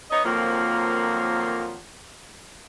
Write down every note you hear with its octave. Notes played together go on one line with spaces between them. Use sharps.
B3 D#4 C#5 D#5
F2 D#3 F3 F#3 A#3 F4